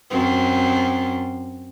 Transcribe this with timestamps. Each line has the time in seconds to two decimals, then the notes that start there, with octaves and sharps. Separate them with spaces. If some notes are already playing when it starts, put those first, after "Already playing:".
0.11 F#2 C4